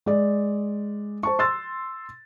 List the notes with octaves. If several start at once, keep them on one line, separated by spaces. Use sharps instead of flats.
G#3 D5
C5 A5 C#6
C6 E6 A6